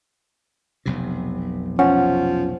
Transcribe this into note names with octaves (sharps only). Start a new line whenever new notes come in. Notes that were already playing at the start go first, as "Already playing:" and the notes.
F1 B1 C3
F3 C#4 F#5